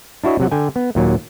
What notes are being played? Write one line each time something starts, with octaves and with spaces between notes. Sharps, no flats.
D4 E4 F#4 C#5 D#5
C3 F#3 F#5
D3 G5 G#5
B3
D#2 A#2 F#3